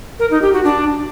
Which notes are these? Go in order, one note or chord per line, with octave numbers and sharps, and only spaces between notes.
A#4
D#4
G4
F#4
D4